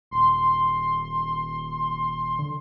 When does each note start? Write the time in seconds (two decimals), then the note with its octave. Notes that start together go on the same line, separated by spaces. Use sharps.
0.11 D#1 C6
2.39 D3